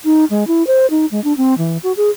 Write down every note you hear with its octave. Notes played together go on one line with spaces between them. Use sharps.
D#4
G#3
E4
C5
D#4
G#3
D4
C4
E3
F#4
G#4